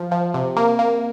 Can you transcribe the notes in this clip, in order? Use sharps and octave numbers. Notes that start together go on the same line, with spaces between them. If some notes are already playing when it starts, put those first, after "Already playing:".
Already playing: F3
F3
C3
A#3
A#3